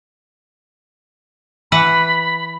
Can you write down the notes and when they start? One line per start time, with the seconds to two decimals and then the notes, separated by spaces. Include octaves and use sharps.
1.72 E3 B4 F#5 B5